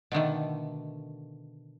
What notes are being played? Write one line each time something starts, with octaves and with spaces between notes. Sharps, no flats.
B2 D3 D#3 A3